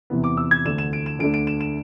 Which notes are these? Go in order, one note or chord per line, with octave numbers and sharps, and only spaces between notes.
E2 C3 E3 B3
D6
E6
G#6
D2 D3 A3 D4 E7
E7
D7
E7
D2 D3 A3 D4 D7
D7
E7
E7